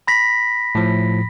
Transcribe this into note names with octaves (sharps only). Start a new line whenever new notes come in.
B5 A#6 B6
A2 F3